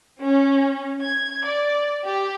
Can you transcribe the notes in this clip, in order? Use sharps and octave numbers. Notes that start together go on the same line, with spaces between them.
C#4
G#6
D5
G4